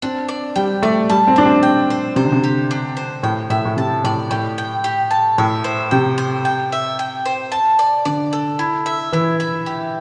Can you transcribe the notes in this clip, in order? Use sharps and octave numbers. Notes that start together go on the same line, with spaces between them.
C4 D4
D5
G3 G5
A3 D5
G3 A5
C4
D4 C5
C4
G5
C5
C3 C5
D3
C3
G4
D4
C5
A2 G5
A2 E5
A2
C3 A5
A2 D5
A2 G4
G5
G4
A5
A2 E5
C5
C3 G5
C5
G5
E5
G5
C5
A5
D5
D3 D5
A4
E4
E5
E3 E4
E5
G4